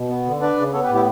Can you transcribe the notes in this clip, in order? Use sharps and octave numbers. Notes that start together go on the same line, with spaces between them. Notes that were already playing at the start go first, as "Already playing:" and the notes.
Already playing: B2
B3
D3
D4 B4 D5
C#3
B3 A4 C#5
G4 B4
A2
E4 G4